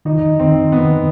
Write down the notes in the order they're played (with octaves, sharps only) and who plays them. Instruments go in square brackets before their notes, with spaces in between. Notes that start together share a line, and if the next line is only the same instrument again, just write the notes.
[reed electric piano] D#3 [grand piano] D#4
[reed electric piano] D#3 [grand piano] C4
[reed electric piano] D#3 [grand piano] B3